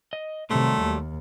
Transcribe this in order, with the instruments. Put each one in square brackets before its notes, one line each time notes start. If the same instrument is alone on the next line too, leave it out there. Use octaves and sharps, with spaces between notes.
[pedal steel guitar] D#5
[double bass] C3 D#3 [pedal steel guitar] F#3 G3 C6 [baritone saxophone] A3
[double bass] D#2